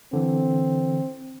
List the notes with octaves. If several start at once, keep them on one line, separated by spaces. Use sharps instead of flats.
D3 E3 C4